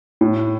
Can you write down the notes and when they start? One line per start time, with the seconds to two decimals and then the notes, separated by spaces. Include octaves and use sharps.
0.21 A2